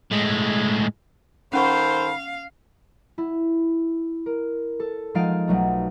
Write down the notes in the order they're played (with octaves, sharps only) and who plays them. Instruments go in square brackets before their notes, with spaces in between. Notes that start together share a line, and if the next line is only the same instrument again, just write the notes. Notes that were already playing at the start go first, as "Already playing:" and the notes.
[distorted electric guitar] A2 G#3
[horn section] D#3 A4 C5 [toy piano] C#4 F#5 C#6 [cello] F5 [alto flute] B5
[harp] E4
A#4
A4
F3 G#3 D#4 F5 A6 D7
B1 F#3 A3